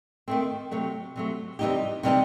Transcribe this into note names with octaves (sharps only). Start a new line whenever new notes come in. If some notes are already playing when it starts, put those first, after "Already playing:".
D#3 A3 C4
C3 F#3 A3
C3 F#3 A3
C3 E3 G3 D#4 G4
C3 E3 G3 D#4 G4